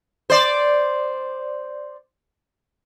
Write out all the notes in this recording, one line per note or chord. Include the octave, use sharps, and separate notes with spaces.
C5 D5